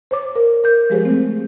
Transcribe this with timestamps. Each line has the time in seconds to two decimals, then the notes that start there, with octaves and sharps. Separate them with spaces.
0.11 C5 C#5 D6
0.35 A#4
0.64 A#4 G6
0.90 F3 G3 G#3 G4 G#4 C5
1.05 A3 C4